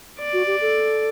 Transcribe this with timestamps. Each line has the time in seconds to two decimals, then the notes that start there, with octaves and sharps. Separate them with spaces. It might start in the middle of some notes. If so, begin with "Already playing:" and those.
0.20 D5
0.33 F#4
0.47 G4
0.61 A4